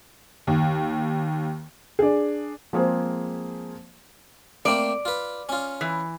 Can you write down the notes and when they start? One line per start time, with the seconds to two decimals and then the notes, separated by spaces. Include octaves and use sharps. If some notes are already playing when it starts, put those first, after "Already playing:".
0.47 D#2
1.99 D4 G#4
2.73 F3 G#3 A#3 C4 G#4 C5
4.65 A3 A#3 C4 D5
5.05 F4 B4
5.49 C#4 F4
5.81 E3